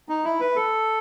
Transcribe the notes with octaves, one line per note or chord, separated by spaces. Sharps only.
D#4
E4
B4
A4